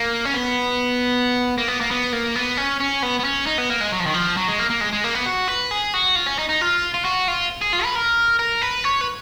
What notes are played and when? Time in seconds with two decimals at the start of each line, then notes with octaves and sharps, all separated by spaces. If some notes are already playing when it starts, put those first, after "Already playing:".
Already playing: A#3
0.25 C#4
0.33 B3
1.58 A#3
1.68 B3
1.81 A#3
1.91 B3
2.13 A#3
2.36 B3
2.58 C#4
2.80 C#4
3.02 B3
3.19 B3
3.24 C#4
3.46 D#4
3.58 B3
3.70 A#3
3.81 G#3
3.92 F#3
4.00 F3
4.06 D#3
4.14 F3
4.37 F#3
4.48 G#3
4.59 A#3
4.70 A#3
4.81 G#3
4.93 G#3
5.04 A#3
5.15 B3
5.26 F#4
5.48 B4
5.71 G#4
5.94 F#4
6.16 F4
6.26 C#4
6.39 D#4
6.49 D#4
6.61 F4
6.94 F4
7.05 F#4
7.28 F4
7.61 G#4
7.73 F4
7.84 B4
7.95 A#4
8.39 A#4
8.62 B4
8.84 C#5
9.01 B4